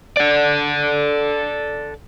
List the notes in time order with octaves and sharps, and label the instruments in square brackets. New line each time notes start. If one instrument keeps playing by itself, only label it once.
[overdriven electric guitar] A4 D5